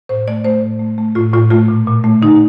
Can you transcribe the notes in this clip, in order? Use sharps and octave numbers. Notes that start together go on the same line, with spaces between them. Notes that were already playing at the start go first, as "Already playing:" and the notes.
A2 C5
A3 D5
A3 C5
A2
A3
A3
A2 F4
A2 F4
A3 F4
A#2
A#2
A3
D3 D#4